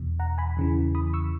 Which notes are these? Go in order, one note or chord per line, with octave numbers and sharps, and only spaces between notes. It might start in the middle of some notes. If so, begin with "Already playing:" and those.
Already playing: E2 B2
F#5 A#5
G#5 B5
E2 C#3 E3
B5 D#6
C#6 E6